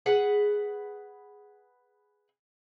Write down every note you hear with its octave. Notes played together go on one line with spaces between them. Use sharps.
G#4 B4 F#5